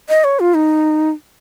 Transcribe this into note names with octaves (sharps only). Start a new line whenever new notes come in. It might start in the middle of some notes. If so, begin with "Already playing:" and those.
D#5
C#5
F4
D#4